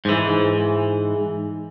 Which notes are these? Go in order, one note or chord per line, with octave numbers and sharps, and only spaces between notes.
G#2 E3